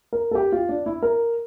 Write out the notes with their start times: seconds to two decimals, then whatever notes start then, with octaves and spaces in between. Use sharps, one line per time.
0.13 A#4
0.31 A4
0.35 G4
0.52 F4
0.69 D4
0.86 E4
1.02 A#4